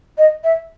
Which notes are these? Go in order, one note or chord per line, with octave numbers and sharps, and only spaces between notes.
D#5
E5